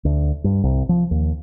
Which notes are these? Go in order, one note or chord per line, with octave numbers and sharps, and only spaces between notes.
D2
G2
C2
F3
D#2